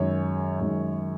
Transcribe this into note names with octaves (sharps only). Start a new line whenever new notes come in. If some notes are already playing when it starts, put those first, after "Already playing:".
Already playing: F#2 D#3 G#3 C#5
F#2 D#3 G#3